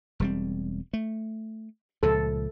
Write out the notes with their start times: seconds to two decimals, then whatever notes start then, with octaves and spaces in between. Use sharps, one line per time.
0.20 E1 G3 C4
0.93 A3
2.03 C#2 A#2 F3 A4